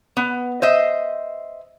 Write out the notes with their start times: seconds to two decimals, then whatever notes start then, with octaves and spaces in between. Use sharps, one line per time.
0.17 B3
0.62 C5 D#5 E5